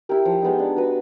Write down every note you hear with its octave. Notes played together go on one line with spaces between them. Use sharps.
E4 G4 A#4
F3
G#3 B3 D#4
D4
F#4 B4